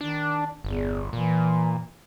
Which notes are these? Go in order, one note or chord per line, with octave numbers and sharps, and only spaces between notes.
D#3 D4
G1 E2
A#2 E3